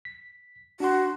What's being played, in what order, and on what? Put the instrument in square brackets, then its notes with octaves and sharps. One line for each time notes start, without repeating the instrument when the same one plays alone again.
[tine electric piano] B6
[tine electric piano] D4 C6 [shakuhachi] F#4